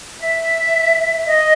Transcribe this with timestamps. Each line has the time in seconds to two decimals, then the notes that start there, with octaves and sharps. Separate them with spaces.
0.19 E5
1.26 D#5